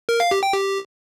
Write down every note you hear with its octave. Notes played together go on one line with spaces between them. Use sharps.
A#4
F5
G4
G5
G4